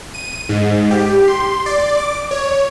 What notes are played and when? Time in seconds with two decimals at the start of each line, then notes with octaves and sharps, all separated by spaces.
0.14 D#7
0.49 G#2
0.91 G4
1.28 C6
1.66 D5
1.97 D6
2.31 C#5